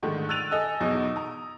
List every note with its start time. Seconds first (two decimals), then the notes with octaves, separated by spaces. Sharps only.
0.03 G#2 D3 D#3 A3
0.29 E6 F#6 A6 D#7 F7
0.51 A4 D#5 G#5 E6
0.80 E2 B2 F#3 D#4
1.16 A#5 D#6